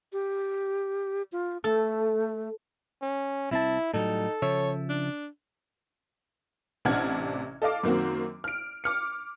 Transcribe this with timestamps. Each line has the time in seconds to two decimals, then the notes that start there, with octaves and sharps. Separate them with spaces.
0.13 G4
1.32 F4
1.64 A3 A4
3.02 C#4
3.51 C2 C4 E4 A5
3.94 A2 F#3 G3 D#4 A4
4.42 C#3 F3 C#5 E5
4.89 D4
6.85 A1 C3 D4 F#5 F6 G#6
7.62 A4 D#5 F5 D6
7.83 F#2 D#3 A#3 C4 F#4
8.44 F6 D7
8.84 D6 F6 C#7